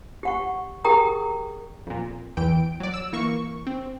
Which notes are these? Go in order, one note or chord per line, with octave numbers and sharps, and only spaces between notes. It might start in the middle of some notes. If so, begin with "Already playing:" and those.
G4 F#5 C#6
G4 G#4 A#4 G5 A#5 D#6
F2 A#2
E2 E3 G5 D7
F#3 D5
E6
E3 A#3 C#6
C4